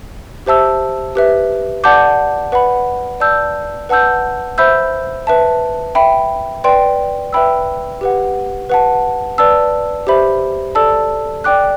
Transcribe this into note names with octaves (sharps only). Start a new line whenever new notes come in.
G4 C5 E5 A5 E6
G4 B4 E5
D5 F#5 A5 D6 G6
B4 F#5 B5
D5 A5 E6 G6
B4 F#5 A5 E6 G6
C5 E5 B5 E6 G6
B4 E5 A5
E5 G5 B5
B4 D5 G5 C6
B4 E5 G5 B5 E6
G4 B4 F#5
B4 F#5 A5
B4 D5 A5 E6
G4 C5 E5 B5
A4 D5 A5 E6
D5 G5 D6 F#6